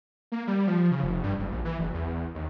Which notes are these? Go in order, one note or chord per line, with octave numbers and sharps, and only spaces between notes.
A#3
G3
F3
C#3
F1
G2
F#1
A#1
E3
F#1
E2
D#2